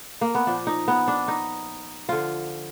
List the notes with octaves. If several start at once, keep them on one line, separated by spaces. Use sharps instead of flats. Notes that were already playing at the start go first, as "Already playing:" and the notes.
A#3
B3
A#2 F3 D4
D#4
B3
D4
D#4
D3 F3 F4